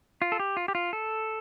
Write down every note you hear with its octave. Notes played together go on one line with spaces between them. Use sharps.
F4
A4
G4
F4
G4
F4
A4